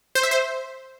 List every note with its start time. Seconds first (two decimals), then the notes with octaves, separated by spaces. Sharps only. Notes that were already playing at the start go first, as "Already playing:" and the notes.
0.15 C5
0.23 E5
0.31 C5